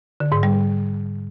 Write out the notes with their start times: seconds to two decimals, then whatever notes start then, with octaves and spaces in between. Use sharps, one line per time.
0.20 D3
0.32 G#2
0.43 G3